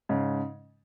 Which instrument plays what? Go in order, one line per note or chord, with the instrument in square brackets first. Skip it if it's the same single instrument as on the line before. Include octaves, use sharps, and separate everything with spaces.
[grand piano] G#2 C#3